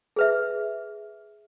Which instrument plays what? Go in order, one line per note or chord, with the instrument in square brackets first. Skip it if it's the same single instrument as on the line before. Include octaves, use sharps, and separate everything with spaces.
[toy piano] G#4 B4 E5